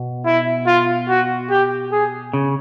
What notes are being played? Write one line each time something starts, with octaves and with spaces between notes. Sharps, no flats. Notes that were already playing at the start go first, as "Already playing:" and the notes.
Already playing: B2
E4
F4
F#4
G4
G#4
C#3